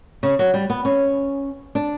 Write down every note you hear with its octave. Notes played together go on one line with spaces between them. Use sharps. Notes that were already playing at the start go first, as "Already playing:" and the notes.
C#3
F#3
G3
B3
C#4
D4